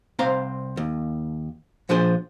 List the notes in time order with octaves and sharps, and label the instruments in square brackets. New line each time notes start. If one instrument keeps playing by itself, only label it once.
[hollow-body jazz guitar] C2 C4 C5 F5 A#5
D#2
A#2 F3 D4 G#4 C5